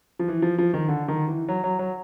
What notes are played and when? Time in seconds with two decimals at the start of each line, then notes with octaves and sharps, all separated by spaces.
0.19 F3
0.28 E3
0.42 F3
0.58 F3
0.74 D#3
0.88 D3
1.08 D#3
1.28 E3
1.48 F#3
1.64 F#3
1.79 F#3